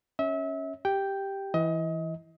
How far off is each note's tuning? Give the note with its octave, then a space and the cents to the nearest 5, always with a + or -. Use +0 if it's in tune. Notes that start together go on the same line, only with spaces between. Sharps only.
C#4 +0 E5 -30
G4 +0 G5 +0
E3 +0 D#5 +30